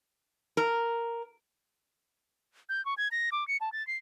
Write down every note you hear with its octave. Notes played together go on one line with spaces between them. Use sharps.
A#4
G6
C#6
G#6
A#6
D6
C#7
A5
A6
C7